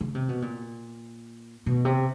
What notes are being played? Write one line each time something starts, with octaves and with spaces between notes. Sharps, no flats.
C#3
C3
B2
A#2
B2
C3